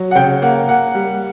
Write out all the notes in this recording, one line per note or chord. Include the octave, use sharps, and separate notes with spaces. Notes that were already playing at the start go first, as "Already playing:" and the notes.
Already playing: F#3
F#5
C#3 G5
A#3 F#5
A#3 F#5
G3